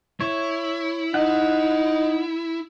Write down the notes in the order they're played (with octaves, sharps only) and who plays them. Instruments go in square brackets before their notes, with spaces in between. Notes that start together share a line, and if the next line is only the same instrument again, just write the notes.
[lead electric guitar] E4 [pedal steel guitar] C#5
[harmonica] D#4 [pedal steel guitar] F#5